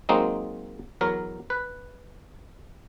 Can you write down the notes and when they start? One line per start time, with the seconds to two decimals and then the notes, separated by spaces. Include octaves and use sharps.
0.09 F#3 G#3 A#3 C4 D#4
1.01 E2 F#3 A#4
1.50 B4